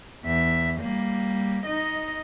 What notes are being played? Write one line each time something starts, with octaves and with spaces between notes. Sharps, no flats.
E2 E5
G3 A#3
D#4 D#5